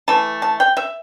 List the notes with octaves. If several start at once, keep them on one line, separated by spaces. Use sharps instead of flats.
E3 A3 A5
A5
G5
E5